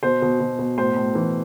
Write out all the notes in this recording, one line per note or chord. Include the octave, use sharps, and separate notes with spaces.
B2 C5
B2
B2
B2
A2 C5
A2
E3